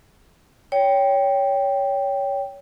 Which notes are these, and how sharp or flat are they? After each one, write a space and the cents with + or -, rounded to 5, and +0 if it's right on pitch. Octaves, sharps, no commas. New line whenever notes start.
C#5 +20 G5 +0